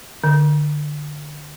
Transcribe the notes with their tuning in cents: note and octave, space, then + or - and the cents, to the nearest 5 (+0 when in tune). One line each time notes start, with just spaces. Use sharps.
D3 +15